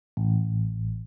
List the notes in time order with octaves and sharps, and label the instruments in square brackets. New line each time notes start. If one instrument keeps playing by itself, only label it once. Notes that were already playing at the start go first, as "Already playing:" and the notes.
[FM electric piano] A1